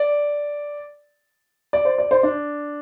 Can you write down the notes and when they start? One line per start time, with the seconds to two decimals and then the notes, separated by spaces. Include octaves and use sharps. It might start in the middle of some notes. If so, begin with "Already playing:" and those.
Already playing: D5
1.73 D5
1.85 C5
1.98 D5
2.11 C5
2.23 D4